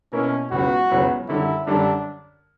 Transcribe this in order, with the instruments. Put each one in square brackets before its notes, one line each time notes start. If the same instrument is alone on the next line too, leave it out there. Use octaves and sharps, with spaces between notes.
[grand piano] B2 A#3 E4 A#4 [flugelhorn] C#4
[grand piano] C#2 C#3 F#3 B3 E4 [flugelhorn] F#4
[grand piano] C#2 C#3 F#3 B3 E4
[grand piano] F#2 D3 G3 [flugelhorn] E4
[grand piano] F#2 D3 G3 [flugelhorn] D4